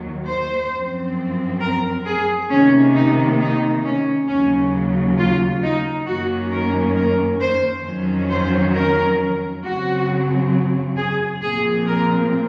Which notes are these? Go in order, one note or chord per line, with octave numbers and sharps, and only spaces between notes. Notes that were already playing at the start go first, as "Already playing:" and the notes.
Already playing: D#2 D#3 F#3
C5
F#2 F3 C4
A#4
G#4
C3 D#3 A#3 C#4
D#4
D#4
C#4
D#2 C#3 F#3 C#4
F4
D#4
F#2 D#3 A#3 C#4 F#4
A#4
A#4
C5
F2 D#3 F#3 C#4
C5
A#4
F#2 C#3 F#3 C4 F#4
G#4
A#2 F3 C4 G#4
A#4